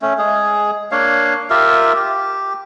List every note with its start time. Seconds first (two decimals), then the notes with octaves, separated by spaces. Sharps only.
0.02 A3 C#4
0.18 G#3 G#4
0.91 A#3 D4 C#5 F5
1.50 F4 G4 A#4 E5
1.96 G4